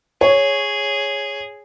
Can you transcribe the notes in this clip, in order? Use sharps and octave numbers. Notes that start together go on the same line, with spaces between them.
G#4 C#5